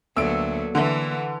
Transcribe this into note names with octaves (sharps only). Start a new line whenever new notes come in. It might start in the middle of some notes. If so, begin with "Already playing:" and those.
D2 F#3 A#3 B3 A4 D5 E6 D7
D3 E3 E5 C6